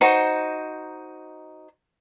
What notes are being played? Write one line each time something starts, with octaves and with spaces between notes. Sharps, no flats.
D#4 F#4 C5 A#5